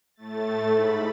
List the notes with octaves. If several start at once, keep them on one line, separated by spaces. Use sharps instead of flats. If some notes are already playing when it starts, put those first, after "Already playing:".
A2 A3 A6
G#2 B5